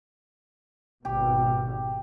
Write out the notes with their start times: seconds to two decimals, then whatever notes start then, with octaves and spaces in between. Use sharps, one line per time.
1.05 G#1 B2 G4